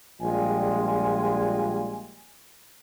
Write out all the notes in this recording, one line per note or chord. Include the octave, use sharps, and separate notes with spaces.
A#1 G3 G#3 F4 G#5